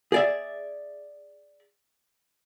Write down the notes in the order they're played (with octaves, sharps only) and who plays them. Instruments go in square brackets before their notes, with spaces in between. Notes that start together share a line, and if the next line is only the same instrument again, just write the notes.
[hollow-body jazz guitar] G#4 D5 E5